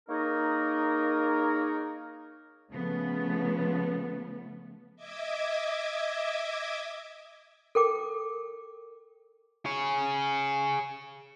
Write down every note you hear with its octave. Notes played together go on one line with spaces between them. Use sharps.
A#3 D#4 G#4 A#4 C#5 D#5
C#3 F3 A3 B3
D#5 E5 D6 G#6
A4 A#4 G5 D6
G#4 C#5